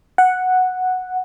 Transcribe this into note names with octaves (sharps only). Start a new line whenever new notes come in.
F#5